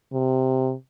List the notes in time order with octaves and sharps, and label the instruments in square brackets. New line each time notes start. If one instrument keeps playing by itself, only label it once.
[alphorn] C3